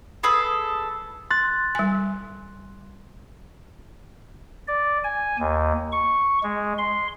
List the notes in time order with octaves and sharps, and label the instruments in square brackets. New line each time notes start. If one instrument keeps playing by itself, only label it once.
[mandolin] G#4 A4 B4
[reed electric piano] C6 F#6 [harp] A6
[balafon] G3 G#5
[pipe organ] D5
G#5
D#2
C#6
G#3
C6